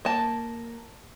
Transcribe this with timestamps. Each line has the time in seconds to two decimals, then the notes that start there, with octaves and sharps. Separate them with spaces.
0.05 A#3 A5